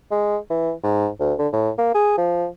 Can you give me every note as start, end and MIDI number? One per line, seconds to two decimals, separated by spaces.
0.11 0.37 56
0.50 0.72 52
0.84 1.08 44
1.20 1.34 38
1.39 1.48 50
1.53 1.70 45
1.78 1.94 58
1.94 2.17 68
2.17 2.47 53